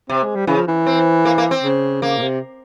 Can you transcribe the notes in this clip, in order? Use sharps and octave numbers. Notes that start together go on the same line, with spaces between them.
C3 C4
G#3
G3
C#3 E3
F3
E3
C4
A#3
A#3
C4
C#3
C#3 A#3
A#2
C3